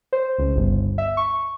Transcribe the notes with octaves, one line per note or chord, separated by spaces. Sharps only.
C5
C#2
G1
E5
C#6